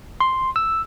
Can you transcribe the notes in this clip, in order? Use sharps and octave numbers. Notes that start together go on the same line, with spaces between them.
C6
E6